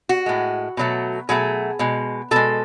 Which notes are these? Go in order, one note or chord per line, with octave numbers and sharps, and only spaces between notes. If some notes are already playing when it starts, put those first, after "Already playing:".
F#4
A2 G#3
B2 F#3 A3
B2 F#3 A3 G#4
B2 G#3
B2 G#3 A4